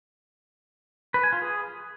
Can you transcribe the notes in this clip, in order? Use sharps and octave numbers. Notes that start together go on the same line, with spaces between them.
B4
G#5
F4
G#4